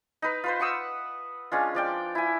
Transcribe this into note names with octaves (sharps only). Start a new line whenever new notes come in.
D#4 B4
F4 B4 C5
F#5 C#6 D#6 E6
G#3 C#4 D4 F4
F3 D5 G5
E4 G#5